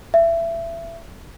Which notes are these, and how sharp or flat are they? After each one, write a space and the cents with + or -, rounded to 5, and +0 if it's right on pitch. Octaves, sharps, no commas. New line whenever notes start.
E5 +25